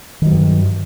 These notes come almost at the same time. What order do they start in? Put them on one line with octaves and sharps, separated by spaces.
D#3 F#3 G2